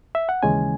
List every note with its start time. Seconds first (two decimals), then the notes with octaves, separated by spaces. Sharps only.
0.15 E5
0.29 F#5
0.43 D#2 C#3 E3 G#3 C#4 G#5